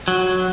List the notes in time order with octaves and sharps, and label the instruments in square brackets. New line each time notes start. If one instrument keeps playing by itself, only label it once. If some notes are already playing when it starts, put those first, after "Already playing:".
[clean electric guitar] F#3